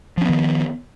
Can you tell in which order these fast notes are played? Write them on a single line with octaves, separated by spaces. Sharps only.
F3 C#4 B3 D#3